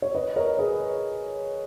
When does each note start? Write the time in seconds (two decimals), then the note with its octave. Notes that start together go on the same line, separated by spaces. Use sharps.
0.02 C#5
0.15 B4 D#5
0.36 A#4 C#5
0.59 G#4 B4